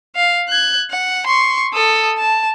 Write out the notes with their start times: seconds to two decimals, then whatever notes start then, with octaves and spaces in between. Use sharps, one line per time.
0.16 F5
0.49 F#6 G#6
0.90 F#5
1.27 C6 C#6
1.74 A4 D#6
2.18 A5